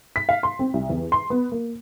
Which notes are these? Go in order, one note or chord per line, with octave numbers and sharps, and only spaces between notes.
B6
F5
C6
C4
C2
E2
C6
B3
A#3